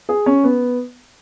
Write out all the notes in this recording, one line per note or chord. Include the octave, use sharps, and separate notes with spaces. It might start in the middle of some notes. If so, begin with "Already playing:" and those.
G#4
C#4
B3